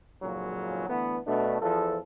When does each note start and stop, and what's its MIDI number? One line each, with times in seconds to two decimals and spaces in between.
0.23 0.85 32
0.23 0.85 41
0.23 0.85 46
0.23 0.85 49
0.23 0.85 54
0.23 0.85 61
0.89 1.18 50
0.89 1.18 52
0.89 1.18 57
0.89 1.18 59
1.27 1.58 47
1.27 1.58 57
1.27 1.58 62
1.61 1.97 40
1.61 1.97 53
1.61 1.97 69